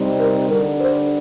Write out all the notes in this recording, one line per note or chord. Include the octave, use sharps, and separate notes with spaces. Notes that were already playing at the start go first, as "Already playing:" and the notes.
Already playing: C3 G3 C4 D#4
A#4
D3 G3 D4 A#4
C5